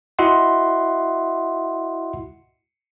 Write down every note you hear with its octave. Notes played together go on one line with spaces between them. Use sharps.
E4 F#4 D#5 E5 F#5 C6